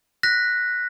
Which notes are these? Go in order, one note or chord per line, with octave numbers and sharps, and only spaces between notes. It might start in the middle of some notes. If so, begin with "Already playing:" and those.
F#6 A#6 B6